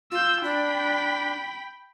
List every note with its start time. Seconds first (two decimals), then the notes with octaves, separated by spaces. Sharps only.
0.12 F4 E6 G6
0.43 D4 G5 B5